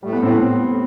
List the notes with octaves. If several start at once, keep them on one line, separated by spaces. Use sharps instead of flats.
A2 G3
B3
A2 C4